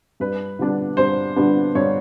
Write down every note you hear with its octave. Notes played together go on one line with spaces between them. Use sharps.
G2 B4
D3 G3 B3 D4
G2 C5
D3 G3 B3 D4
G2 C#5